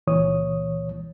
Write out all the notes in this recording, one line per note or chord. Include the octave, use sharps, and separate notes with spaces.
C#2 A#2 E3 C#5 D#6